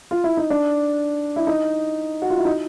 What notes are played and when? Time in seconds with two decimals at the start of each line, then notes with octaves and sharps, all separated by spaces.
0.11 F4
0.24 E4
0.37 D#4
0.50 D4
1.36 E4
1.47 D#4
2.22 F#4
2.30 F4
2.38 E4
2.45 D#4